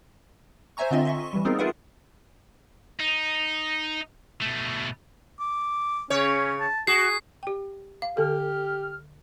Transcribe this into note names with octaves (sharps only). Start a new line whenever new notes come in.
C5 C#5 E5 G#5 A#5 C#6
D3 C4 F4 D#5 E5 C6
D#5 E5 C#6
E3 G3
B3 C4 D#4 F4 G#4 A#4
F4 G#4 A#4 B4 E5 F#5
D#4
B2 A3
D6
C#3 C#4 C#5
A5
F#4 G#4 C7
G4 G5
F5
D3 G4 A4 F6